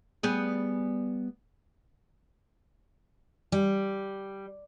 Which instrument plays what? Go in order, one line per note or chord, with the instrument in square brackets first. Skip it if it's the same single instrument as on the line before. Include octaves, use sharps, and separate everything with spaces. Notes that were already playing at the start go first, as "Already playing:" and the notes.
[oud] G3 B3 G#4
[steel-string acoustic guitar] G3